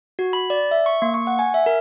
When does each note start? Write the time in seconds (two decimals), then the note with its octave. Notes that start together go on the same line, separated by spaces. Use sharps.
0.19 F#4
0.33 B5
0.50 D5
0.71 E5
0.86 C#6
1.02 A#3
1.14 C#6
1.27 F#5
1.39 G#5
1.54 E5
1.66 A#4